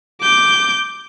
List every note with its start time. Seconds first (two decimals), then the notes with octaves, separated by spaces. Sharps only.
0.22 D6 G6